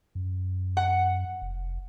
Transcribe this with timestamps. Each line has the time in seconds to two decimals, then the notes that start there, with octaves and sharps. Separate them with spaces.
0.15 F#2
0.77 F#5
1.42 F1